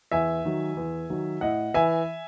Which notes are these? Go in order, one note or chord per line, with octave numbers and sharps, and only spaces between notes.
E2 E5 G#5
D#3 F#3
E2
D#3 F#3
A2 D#5 F#5
E3 E5 G#5